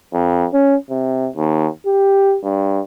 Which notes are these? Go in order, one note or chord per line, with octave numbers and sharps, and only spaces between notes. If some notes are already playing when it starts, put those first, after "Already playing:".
F2
C#4
C3
D#2
G4
G2